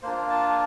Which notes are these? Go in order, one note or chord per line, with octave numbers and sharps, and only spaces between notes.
A#3 D4 F4 C5
A5